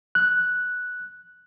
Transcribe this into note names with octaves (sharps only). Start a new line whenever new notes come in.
F#6